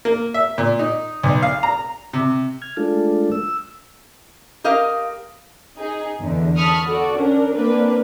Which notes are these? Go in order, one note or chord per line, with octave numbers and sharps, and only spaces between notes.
A#3
E5
A#2
D#4
B1
F5
A#5
C3
F6 G#6
G#3 A3 D4 F4 A4
E6
G4 A#4 D#5 F5
D#4 G#4
E2 D3
A5 B5 C#6 D#6 F6
F#4 A4 D5
C#4 D4 A#4
A#3 C4 D4 B4